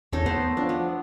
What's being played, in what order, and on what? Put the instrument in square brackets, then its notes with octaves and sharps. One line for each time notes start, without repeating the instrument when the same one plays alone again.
[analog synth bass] E2 [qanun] D#4 A4 C#5
[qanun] A3 C5 [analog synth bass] B3
[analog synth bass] F3 [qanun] D4
[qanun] B3